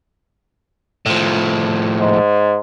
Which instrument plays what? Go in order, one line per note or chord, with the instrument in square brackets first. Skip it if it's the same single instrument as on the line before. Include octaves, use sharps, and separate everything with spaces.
[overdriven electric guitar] A2 F3
[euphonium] G#2